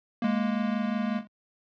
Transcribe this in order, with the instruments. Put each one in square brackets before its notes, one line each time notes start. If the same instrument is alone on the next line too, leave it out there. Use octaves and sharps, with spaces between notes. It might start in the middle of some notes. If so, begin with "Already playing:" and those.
[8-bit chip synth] G#3 A#3